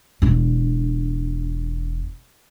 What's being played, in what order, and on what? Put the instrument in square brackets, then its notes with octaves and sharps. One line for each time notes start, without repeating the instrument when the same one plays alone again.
[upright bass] E1 D4